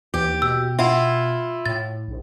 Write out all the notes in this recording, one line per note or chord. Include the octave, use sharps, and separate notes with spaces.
D#2 E3 G4
B2 E6
E4 F4 E5 F#5
A2 A6
A#1